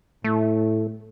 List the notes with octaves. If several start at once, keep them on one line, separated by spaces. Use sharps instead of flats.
A2 A3